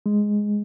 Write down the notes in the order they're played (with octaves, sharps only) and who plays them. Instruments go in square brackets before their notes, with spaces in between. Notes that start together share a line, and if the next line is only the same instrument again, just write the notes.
[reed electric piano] G#3